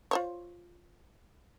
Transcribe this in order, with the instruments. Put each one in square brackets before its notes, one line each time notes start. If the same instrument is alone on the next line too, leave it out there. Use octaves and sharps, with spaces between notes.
[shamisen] F4 C5 C#5